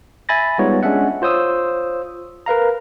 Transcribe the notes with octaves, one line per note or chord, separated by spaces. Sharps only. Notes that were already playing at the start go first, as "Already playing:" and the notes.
E5 G#5 B5 A6 A#6
G3 G#3 B3 D#4 F4 C#5
G#3 C#4 D4 E5 F#5
F4 C5 C#5 D#6 E6
A#4 B4 F5 A#5